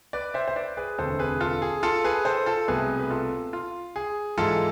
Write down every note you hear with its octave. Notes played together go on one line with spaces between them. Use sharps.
B4 D5
C5 E5
C5
B4 D5
G#4 B4
E1 D2 C3 A4 C5
G#4 B4
F4 A4
G#4
F4 A4
G#4 B4
A4 C5
F4 A4
C2 B2 A3 G#4 B4
B4
F4 A4
F4
G#4
G#2 E3 G#3 F4 A4